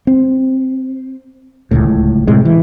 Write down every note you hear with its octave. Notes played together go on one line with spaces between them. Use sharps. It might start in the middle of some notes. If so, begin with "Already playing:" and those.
C4
D1 G1 C#2 A2
A2 C3 G#3
E3